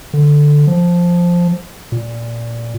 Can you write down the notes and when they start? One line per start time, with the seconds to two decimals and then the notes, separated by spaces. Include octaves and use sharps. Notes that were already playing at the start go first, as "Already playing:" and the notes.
0.13 D3
0.67 F3
1.92 A#2